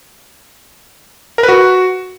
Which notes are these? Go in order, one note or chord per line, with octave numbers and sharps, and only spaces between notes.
A#4
B4
F#4